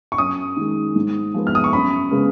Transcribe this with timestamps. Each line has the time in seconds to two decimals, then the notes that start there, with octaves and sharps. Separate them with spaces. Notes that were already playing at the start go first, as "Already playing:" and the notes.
0.12 C#6
0.18 F#2 D#6
0.57 D#3 G#3
0.96 G#2
1.34 F3 G#3 B3
1.47 F6
1.55 D#6
1.64 C#6
1.73 F#2 B5
2.11 C#3 G#3 B3